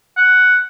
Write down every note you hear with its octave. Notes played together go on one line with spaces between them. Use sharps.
F#5